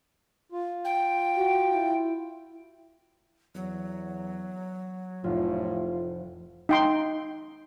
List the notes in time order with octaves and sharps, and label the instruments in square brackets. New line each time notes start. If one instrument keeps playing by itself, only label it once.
[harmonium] F4
[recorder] G5
[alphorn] F#4
E4
[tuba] E2 [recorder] F#3
[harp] F1 [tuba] A2 [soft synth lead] F4
[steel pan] D#4 G5 C6